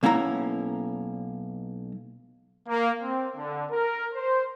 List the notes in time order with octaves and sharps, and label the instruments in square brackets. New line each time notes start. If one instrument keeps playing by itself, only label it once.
[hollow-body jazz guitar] B1 A#3 C#4 E4 A#5
[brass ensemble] A#3
C4
D3
A#4
C5